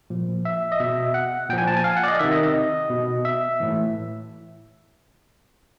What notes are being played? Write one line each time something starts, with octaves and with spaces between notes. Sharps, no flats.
A#2 F3
E5
D#5
B2 E5
F#5
A#2 F3 G5
G#5
A5
G#5
F5
F#5
D5
D#5
C3 D#3 E5
D#5
D#5
B2
E5
A2 E3